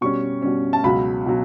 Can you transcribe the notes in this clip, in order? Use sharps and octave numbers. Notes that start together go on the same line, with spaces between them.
B2 G3 C#4 C#6
B2 G3 C#4
A5
C#2 B2 F#3 B5
B2 F#3